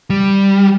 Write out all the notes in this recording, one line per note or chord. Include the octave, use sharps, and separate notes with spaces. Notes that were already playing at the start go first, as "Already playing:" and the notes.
G3